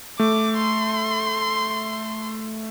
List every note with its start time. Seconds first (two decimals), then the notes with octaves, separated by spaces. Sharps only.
0.19 A3 D6
0.57 C6